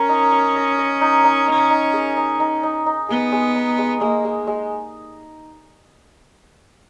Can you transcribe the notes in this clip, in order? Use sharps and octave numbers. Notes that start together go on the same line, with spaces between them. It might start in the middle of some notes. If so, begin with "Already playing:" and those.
Already playing: C#4 A#4
D#4
D#5
D#5
D#5
D#4
D#4
D#4
D#4
G#4
D#4
D#4
D#4
D#4
B3 G#4
G#3
D#4
G#3
G#3 A#3
G#3
G#3